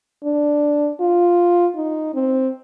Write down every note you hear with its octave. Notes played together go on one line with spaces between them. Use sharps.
D4
F4
D#4
C4